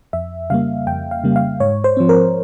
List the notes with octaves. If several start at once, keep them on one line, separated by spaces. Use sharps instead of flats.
F2 E5
C#3 G3 A#3 F5
F2 G5
F5
C#3 G3 A#3
F5
G#2 C#5
C5
F3 C4
A#4